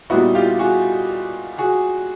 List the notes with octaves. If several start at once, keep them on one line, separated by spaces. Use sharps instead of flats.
A#2 G3 B3 D#4 E4 F#4
F4 G4
F#4 G#4
F#4 G#4